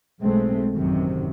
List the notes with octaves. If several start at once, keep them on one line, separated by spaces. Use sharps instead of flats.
B1 G#3 A3 C4
A1 F#2 C3 D#3